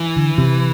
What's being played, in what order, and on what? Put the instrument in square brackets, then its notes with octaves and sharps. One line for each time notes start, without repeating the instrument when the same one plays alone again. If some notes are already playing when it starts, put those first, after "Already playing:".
Already playing: [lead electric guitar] E3
[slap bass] D3
C3